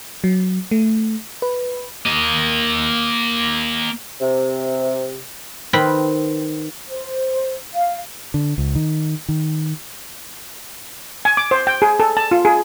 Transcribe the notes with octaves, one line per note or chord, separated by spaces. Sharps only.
F#3
A3
B4
A#3 D#5
C3
D#3 C4 B4 G5 B5
C5
F5
D3
C#2
D#3
D#3
G#5
D6
C5
G5
G#4
A4
A5
F4
G#4